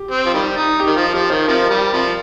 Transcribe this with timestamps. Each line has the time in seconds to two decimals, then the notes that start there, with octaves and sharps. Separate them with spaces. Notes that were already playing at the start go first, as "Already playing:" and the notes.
Already playing: G4
0.11 C4
0.26 F3
0.34 D#3 G3
0.57 D#4
0.80 G4
0.86 D#3
0.96 F3
1.13 F3 G4
1.30 D#3 C5
1.48 C3 F3 A#4
1.70 G3
1.93 C3 F3